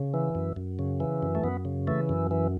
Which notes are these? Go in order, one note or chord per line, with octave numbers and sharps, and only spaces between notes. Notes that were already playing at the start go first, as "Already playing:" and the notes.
Already playing: C#3
E3
F#2
F#2
C#3
E3
F#2
A3
F#2 B3
C#3
E3 A3
F#2
E3